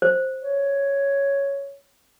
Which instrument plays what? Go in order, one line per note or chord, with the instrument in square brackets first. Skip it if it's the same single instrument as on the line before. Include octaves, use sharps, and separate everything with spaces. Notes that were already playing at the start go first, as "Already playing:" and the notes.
[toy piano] C5
[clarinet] C#5